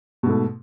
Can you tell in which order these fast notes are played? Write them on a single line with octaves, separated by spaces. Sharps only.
B2 G#2 A3